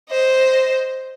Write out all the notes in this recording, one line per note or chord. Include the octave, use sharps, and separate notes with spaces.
C5 D#5